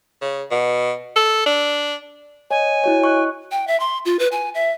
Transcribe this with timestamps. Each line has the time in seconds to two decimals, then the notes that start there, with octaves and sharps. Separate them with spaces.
0.22 C#3
0.51 B2
1.16 A4
1.46 D4
2.51 C#5 D#5 G#5
2.84 E4 F#4 C#5
3.02 D#5 C#6 F#6
3.51 G5
3.67 E5
3.80 C6
4.05 F4
4.19 B4
4.32 G#5
4.55 E5